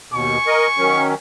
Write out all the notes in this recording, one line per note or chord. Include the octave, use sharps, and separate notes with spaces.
D#2 B2 G#5 C#6
A#4 D#5
D#3 F#3 C#4